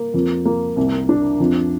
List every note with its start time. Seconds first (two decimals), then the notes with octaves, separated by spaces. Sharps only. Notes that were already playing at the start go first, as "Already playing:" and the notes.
Already playing: A#3
0.14 F2
0.45 A#3
0.76 C2
1.09 D4
1.40 F2